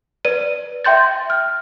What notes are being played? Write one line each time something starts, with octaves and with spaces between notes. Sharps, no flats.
B4 D5 D#7
E5 G5 C6 G6 A6
F6